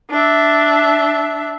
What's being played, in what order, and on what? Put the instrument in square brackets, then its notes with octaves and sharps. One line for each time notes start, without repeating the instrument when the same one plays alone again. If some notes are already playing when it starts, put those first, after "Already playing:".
[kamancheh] D4 E5